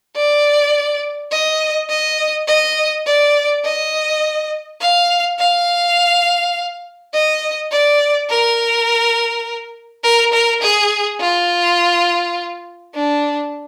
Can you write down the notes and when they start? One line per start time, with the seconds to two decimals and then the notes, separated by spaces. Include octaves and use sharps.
0.16 D5
1.31 D#5
1.90 D#5
2.48 D#5
3.06 D5
3.64 D#5
4.81 F5
5.39 F5
7.13 D#5
7.71 D5
8.30 A#4
10.04 A#4
10.33 A#4
10.62 G#4
11.20 F4
12.95 D4